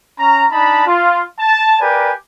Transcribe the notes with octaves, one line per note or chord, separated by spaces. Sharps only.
C#4 A#5
D4 D#4 A5 B5
F4
A5
G4 A#4 B4 D5 G#5